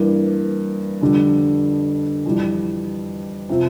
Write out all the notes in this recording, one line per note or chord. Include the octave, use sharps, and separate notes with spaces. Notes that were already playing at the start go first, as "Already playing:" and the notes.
Already playing: G2 E3 A#3
F2 D3 G3
F2 E3 G3
C3 F3 C4 F4